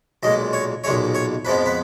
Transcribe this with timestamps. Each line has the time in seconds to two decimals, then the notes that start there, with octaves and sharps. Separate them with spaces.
0.23 B1 A#2 G#3 D#5
0.53 C#5
0.84 B1 A#2 G#3 C#5
1.14 C#5
1.45 F2 F3 G#3 B3 B4
1.66 B4